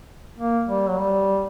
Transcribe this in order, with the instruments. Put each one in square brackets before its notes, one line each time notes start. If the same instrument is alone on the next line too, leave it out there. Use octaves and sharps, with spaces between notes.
[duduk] A#3
G3
F#3
G3